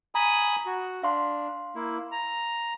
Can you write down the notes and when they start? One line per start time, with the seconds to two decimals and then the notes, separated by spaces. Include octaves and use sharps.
0.15 G#5 A#5 B5 D#6
0.66 F#4
1.03 D4 F5 C6
1.75 A#3 E4
2.11 A#5